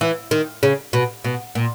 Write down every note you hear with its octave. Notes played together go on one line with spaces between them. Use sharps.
E3
D#3
C#3
B2
B2
A#2